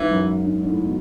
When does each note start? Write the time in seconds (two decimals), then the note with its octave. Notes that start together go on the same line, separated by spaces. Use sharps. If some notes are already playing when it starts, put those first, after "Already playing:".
Already playing: G#2 E3
0.11 F#2
0.45 G#2
0.63 G#2
0.68 A2
0.84 B2